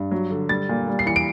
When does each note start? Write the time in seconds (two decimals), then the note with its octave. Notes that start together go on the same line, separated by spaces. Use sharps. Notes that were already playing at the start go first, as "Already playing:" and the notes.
Already playing: G2
0.11 F#3
0.30 D3
0.49 G3 A6
0.69 A#2
0.88 G3
0.99 C7
1.06 E3 C#7
1.16 D7